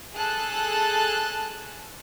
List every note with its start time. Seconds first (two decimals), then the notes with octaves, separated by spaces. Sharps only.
0.15 G#4 A4 A5 F#6